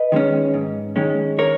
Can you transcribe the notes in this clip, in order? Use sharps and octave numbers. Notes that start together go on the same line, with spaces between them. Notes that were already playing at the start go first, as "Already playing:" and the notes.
Already playing: B4 D#5
D#3 G#3 C#4
G#2
D#3 G#3 C#4
A#4 C#5